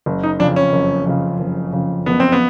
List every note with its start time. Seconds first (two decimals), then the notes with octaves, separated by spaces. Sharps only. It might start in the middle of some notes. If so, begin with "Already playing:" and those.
0.06 F#1
0.23 D#4
0.40 F2 D4
0.43 C#3
0.56 C#4
0.73 F#1
1.07 F2 C#3
1.40 F#1
1.73 F2 C#3
2.06 F#1 B3
2.20 C4
2.32 B3